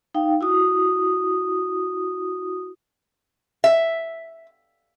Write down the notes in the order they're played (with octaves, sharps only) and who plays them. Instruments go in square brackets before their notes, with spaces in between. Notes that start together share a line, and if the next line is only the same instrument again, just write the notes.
[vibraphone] D#4 F5 G5
E4 F#4 D#6
[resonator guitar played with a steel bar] E5